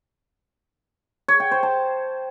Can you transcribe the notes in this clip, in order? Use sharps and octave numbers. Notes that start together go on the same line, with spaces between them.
C#5
G5
C5
A5